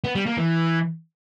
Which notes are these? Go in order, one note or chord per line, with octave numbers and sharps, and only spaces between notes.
B3
G3
A#3
E3